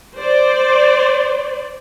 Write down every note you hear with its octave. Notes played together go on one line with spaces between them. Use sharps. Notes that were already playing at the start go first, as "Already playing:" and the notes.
C5 D5